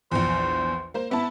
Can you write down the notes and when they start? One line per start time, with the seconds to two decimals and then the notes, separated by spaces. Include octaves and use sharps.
0.11 A#1 E2 C5
0.94 A#3 C5
1.11 B3 E4 A5